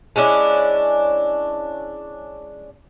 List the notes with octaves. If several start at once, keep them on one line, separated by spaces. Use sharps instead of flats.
G#3 C#4 D4 E4